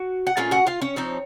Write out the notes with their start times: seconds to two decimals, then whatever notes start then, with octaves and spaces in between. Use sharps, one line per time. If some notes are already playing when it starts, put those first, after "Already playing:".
Already playing: F#4
0.27 F#5
0.37 A#2 A3 C#4 F4 F5
0.51 F#4 F#5
0.67 F4 F5
0.81 C#4 C#5
0.96 F3 C4 D#4